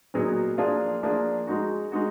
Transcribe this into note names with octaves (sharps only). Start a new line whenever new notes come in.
A#2 F#3 B3 D#4 G#4
F3 A#3 D4 F4 G#4
F3 A#3 D4 F4 G#4
G#3 D#4 F#4
G#3 D#4 F#4